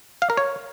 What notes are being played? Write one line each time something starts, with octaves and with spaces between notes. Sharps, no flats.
F5
A#4
C#5